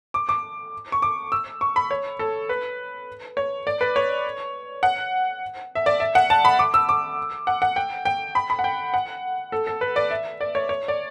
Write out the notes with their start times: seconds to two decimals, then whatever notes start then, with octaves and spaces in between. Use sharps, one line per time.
0.14 D6
0.29 D6
0.92 C#6
1.02 D6
1.32 E6
1.61 C#6
1.76 B5
1.91 C#5
2.19 A4
2.49 B4
3.37 C#5
3.67 D5
3.81 B4
3.96 C#5
4.83 F#5
5.75 E5
5.86 D5
6.00 E5
6.15 F#5
6.30 A5
6.45 B5
6.59 D6
6.74 E6
6.89 D6
7.47 F#5
7.62 F#5
7.76 G5
8.05 G5
8.35 B5
8.50 B5
8.59 F#5
8.64 G5
8.94 F#5
9.52 A4
9.67 A4
9.81 B4
9.96 D5
10.11 E5
10.41 D5
10.55 C#5
10.69 C#5
10.88 D5